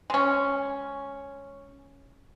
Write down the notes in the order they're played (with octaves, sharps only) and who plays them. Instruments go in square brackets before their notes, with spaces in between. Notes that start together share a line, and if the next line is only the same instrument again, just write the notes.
[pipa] G#3 C#4